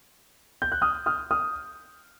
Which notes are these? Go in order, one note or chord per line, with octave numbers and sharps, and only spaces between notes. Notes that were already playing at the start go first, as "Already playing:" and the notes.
G6
F#6
D#6 F6
D#6 F6
D#6 F6